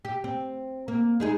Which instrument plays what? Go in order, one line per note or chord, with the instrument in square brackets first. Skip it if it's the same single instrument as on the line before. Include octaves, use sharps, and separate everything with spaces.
[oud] G4
C4
A#3
G#3 D#4 G#4